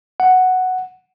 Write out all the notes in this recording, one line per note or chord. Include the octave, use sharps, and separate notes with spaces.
F#5